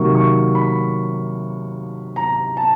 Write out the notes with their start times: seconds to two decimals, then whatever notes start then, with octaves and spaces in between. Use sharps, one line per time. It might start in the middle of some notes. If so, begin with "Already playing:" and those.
Already playing: C3 D#3 F#3 A#3 C#6
0.15 C#6
0.55 B5
2.16 A#5
2.57 A5